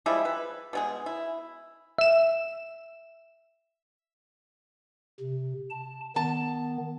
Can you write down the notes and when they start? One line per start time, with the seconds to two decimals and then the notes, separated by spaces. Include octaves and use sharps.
0.06 F3 G3 G#3 E4
0.25 B4
0.73 B2 G#3 G#4
1.06 E4
1.98 E5 E7
5.20 C3
5.70 A5
6.16 D#3 B3 A5